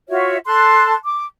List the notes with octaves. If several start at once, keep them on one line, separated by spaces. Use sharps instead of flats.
F4 F#4 C#5 E5
A4 A5 C6 F#6
D6